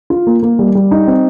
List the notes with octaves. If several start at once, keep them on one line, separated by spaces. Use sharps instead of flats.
F4
A#3
A#3
G3
G3
D#4
C4